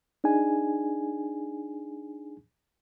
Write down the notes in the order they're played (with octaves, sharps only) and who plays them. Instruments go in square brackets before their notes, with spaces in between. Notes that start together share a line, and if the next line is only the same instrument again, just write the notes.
[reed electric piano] D4 D#4 G#4 G#5